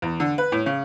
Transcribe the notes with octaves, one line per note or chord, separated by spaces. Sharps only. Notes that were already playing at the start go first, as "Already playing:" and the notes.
E2
D3
B4
A2
C#3